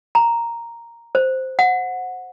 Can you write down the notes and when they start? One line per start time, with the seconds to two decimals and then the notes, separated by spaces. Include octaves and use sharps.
0.15 A#5
1.15 C5
1.59 F#5